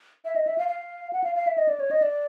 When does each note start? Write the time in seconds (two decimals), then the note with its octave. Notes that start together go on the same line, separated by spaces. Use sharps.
0.25 E5
0.36 D#5
0.47 E5
0.58 F5
0.68 F5
1.13 F#5
1.24 F5
1.35 F5
1.47 E5
1.58 D#5
1.68 D5
1.80 C#5
1.91 D#5
2.02 D5